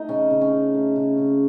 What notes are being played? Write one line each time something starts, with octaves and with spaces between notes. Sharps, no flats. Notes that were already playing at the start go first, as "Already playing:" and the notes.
Already playing: A3 D#4
C#3 C#4
C#3
C#4
C#3
A3
C#3
C#3